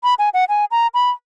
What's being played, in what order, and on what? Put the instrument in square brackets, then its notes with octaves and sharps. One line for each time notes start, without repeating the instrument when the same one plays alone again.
[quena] B5
G#5
F#5
G#5
A#5
B5